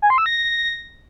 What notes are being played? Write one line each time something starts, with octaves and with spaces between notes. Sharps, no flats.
G#5
C6
E6
A#6